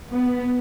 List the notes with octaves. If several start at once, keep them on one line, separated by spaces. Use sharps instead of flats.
B3